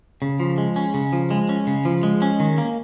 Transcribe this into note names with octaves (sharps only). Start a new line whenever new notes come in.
C#3
F3
G#3
C#4
C#3
F3
G#3
C#4
C#3
F3
G#3
C#4
D#3
A#3